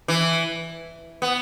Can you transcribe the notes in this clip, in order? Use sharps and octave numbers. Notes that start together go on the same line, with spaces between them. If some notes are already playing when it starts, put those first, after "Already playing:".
E3
B3